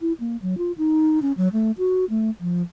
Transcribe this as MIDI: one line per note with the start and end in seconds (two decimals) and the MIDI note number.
0.01 0.13 64
0.20 0.37 58
0.42 0.57 54
0.58 0.72 65
0.78 1.19 63
1.22 1.32 61
1.37 1.48 54
1.53 1.72 57
1.78 2.05 66
2.10 2.30 57
2.40 2.62 53